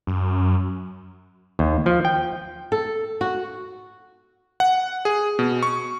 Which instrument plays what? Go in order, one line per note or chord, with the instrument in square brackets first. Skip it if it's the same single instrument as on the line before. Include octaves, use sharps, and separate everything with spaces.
[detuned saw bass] F#2
[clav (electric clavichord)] D#2
F3
G5
[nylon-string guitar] A4
F#4
[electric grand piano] F#5
G#4
B2
C#6